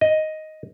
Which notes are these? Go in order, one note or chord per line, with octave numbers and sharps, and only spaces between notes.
D#5